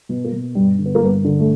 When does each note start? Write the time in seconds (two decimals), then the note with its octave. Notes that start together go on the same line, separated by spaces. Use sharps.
0.09 B2
0.24 A#3
0.32 B2
0.55 G2 G3
0.78 D3
0.86 B3
0.95 A#3
1.01 G2 B3
1.24 D3
1.40 A3